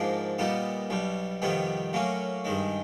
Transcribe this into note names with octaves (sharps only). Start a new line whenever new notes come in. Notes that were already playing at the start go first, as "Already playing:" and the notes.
Already playing: G#2 F3 A#3 D4
A#2 G3 B3 D#4
B1 B2 G3
F2 C3 D#3 G3 B3
A2 F#3 A#3 C#4
G2 D#3 G#3